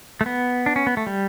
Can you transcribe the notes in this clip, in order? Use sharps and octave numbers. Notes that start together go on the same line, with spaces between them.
A3
B3
D4
C#4
B3
A3
G3